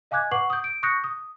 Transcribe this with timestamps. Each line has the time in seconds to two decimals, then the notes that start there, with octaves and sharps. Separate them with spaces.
0.11 D#5 F5 G#5 D6 F#6 G#6
0.31 B4 F#5 C#6 D6 C7 F#7
0.50 D#6 G6
0.64 D7
0.83 C#6 D#6 F#6 G6 A#6 C#7
1.04 D#6